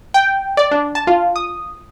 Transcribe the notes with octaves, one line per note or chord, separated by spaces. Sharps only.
G5
D5
D4
A5
F4
D#6